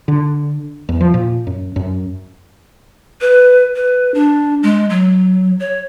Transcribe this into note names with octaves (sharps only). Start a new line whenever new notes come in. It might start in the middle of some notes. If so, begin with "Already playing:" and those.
D3
E2
F3
A#2
F#2
F#2
B4
B4
D4
G#3
F#3
C#5